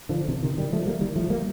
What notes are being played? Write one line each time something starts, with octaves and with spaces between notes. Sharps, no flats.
D3 F3
C3 D#3
C3 D#3
D#3 G3
F3 A3
G3 A#3
D#3 G3
F3 A3
G3 A#3